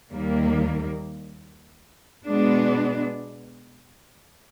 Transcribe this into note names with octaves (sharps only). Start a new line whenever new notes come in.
D#2 D#3 G3 A#3
B2 G#3 B3 D4